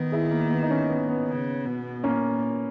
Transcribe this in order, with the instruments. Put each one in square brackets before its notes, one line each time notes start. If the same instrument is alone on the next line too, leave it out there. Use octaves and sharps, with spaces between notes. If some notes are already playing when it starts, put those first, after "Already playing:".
Already playing: [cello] D#3 [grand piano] B3
[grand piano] E4 G#4
A#3
B3
D#4
A#3 C#4
B3
B3
[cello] C#3
B2
[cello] A#2 [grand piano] A#3 C#4